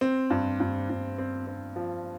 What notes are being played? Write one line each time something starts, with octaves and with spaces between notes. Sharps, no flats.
C4
G2
G2
G2
C4
C4
F3